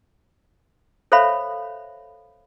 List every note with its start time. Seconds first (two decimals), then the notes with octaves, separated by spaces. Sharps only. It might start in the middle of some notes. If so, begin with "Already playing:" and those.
1.12 A4 C5 C#5 E5 F5 B5